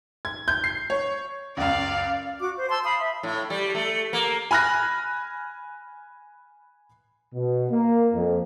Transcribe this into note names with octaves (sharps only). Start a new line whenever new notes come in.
G#6
G6
C7
C#5
C#2 F#2 D5 F5
F#4 D6
C5
A5 C6 E6
F5 B5 D#6
E5
A2
G3
A3
A#3
G#5 B5 F6 F#6 A#6
B2
A#3
F2